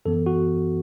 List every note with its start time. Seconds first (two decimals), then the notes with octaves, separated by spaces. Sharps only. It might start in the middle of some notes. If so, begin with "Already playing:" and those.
0.05 F#2 E3 B3 A4
0.26 F#4